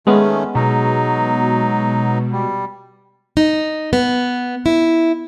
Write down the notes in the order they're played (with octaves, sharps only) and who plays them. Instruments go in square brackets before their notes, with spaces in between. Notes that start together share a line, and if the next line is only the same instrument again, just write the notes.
[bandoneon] D#3 A3 C#4 [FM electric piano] G#3 B3
[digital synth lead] B2 [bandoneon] F#3 D#4
[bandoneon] G3
[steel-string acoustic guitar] D#4
B3
E4